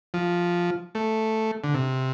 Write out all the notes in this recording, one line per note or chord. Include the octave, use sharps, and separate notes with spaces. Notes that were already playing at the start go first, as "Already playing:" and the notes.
F3
A3
D3
C3